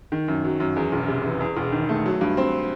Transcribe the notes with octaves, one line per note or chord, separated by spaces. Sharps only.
D#3
F#2
F#3
F#2
E2
E1
C3
E3
E2
E1
D#3
A3
F#3
G2
C4